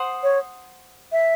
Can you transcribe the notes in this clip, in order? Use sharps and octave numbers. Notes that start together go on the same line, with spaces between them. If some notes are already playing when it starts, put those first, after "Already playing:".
Already playing: C5 F#5 C6 D#6
C#5
E5